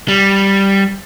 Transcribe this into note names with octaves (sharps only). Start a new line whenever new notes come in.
G3